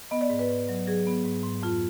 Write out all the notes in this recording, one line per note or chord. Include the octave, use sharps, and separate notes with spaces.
B3 D#5
D5
G#2
B4
G#2
F#3
F#3 G#4
B3
G#2
G#2
F2 F4